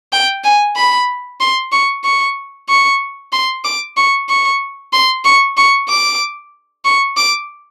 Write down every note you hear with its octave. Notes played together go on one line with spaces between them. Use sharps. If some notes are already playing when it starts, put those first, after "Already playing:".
G5
G#5
B5
C6
C#6
C#6
C#6
C6
D6
C#6
C#6
C6
C#6
C#6
D6
C#6
D6